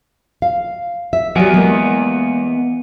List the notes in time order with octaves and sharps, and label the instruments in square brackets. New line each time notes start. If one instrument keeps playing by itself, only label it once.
[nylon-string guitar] F5
E5
[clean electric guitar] E2 B3 G#4 [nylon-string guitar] F#3 G3
[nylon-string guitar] G#3 A#3